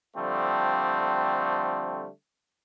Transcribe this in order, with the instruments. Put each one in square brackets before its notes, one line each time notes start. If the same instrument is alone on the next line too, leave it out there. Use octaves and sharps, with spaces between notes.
[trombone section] D3 F3 G3 A3 C4